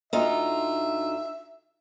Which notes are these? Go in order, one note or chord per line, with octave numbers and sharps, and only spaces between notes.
D2 D#4 F4 E5